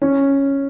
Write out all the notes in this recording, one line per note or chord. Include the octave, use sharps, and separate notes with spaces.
C#4